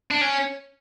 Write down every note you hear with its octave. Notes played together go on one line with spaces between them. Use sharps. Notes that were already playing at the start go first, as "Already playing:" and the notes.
D4
C#4